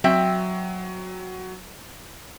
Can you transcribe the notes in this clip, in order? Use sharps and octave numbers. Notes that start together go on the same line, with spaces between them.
F#3 C4 E5 G5